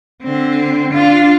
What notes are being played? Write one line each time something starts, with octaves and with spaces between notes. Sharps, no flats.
D3 C4
D4 F4